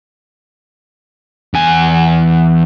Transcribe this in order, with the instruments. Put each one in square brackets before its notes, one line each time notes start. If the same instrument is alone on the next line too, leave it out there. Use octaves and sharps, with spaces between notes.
[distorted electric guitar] E2 G#5